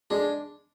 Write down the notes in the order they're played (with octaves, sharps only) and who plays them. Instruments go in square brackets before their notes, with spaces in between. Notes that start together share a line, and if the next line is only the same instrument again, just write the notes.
[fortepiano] G#3 [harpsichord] D4